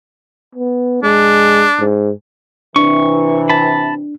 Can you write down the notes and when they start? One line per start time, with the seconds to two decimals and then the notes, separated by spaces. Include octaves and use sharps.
0.55 B3
1.03 G#3 D4
1.80 G#2
2.76 C3 E3 D4 C#6
3.49 A5 B5